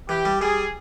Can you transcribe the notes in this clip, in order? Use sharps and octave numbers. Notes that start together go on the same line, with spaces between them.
E3 G4
G3
G3 G#4